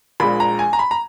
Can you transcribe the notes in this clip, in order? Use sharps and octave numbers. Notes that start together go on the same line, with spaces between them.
A#1 A#2 G#3 B5
A#5
G#5
A#5
B5
A#5